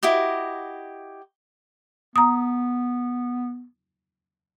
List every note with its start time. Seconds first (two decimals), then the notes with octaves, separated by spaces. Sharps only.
0.03 E4 F#4 G4 D#5
2.16 B3 A#5 D#6